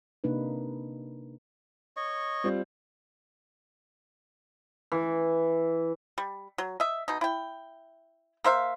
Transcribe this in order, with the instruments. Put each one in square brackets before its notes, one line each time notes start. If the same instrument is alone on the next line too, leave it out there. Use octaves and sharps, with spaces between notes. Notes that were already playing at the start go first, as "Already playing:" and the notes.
[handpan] C3 A#3 D4 D#4 B4
[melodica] C#5 D#5 C#6
[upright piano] G3 C4 F4
[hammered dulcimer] E3
[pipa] G3
F#3
D#5 E5
B2 D#4
E4 G5
A#3 C5 E5 F5